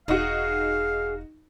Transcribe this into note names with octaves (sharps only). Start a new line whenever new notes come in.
E1 D#4 F#4 G#4 F5